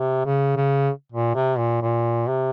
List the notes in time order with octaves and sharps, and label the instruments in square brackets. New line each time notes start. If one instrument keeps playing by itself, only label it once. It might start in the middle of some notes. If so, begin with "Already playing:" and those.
Already playing: [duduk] C3
C#3
C#3
A#2
C3
A#2
A#2
C3